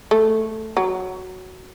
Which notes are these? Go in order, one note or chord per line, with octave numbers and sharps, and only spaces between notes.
A3
F#3